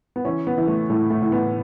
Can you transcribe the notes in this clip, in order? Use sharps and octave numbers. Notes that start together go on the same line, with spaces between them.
B3
E3 C#4
B3
E3
A3
A2 A3
A3
A2
B3